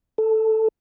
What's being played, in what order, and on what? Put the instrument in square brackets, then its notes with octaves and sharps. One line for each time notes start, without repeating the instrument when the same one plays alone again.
[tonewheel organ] A4